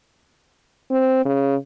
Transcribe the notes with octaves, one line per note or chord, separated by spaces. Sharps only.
C4
C#3